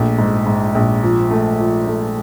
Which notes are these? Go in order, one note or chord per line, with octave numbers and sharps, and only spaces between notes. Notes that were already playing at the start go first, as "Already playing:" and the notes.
Already playing: A#1 A3
G#2
G#2
A#1
F3
A3
F3
A3